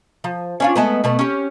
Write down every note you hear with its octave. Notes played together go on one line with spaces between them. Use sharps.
F3
C#4 D4 F4
G#3 A3 B3
B2 A3 B3
C#4 G4